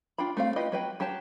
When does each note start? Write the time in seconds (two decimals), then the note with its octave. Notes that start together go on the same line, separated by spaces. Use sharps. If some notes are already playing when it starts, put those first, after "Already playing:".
0.18 D4 F4 G5 B5
0.37 A3 C4 F5
0.56 E4 F4 G4 B4 D#5
0.72 F#3 B4 G5
1.00 F#3 G4 C#5 A5